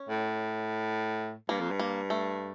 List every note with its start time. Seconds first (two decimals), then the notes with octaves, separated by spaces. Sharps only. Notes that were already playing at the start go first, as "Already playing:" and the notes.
Already playing: C#4
0.09 A2
1.49 G2 A#3
1.60 F2
1.71 G2
1.79 A#3
2.10 A3